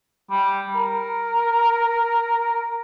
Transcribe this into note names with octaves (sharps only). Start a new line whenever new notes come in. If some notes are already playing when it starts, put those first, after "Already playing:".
G3
A#4